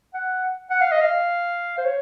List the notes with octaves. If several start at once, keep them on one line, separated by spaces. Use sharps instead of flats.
F#5
F#5
F5
D#5
F5
C5
C#5